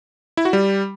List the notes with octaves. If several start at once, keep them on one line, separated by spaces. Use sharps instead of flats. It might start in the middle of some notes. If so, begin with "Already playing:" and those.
E4
F#4
G3